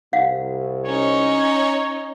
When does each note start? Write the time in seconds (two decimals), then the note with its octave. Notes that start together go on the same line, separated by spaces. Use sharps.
0.13 C2 F5 F#5
0.86 C#4 D#4 C#5